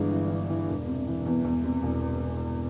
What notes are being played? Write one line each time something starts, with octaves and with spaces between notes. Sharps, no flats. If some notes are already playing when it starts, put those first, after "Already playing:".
Already playing: G1 G2 E3 G#3
E3
E3
E3
E1
C3
E3
E2
E2
C3
E1